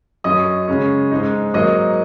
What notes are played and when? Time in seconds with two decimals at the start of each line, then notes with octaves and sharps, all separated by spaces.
0.24 F#2 F#3 C#4 D#5 D#6
0.68 C#3 G#3 C#4
1.11 G#2 G#3 D#4
1.54 G#2 F#3 A#3 D#4 D#5 D#6